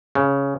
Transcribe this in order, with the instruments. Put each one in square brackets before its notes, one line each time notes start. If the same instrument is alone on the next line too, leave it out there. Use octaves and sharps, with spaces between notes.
[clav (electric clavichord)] C#3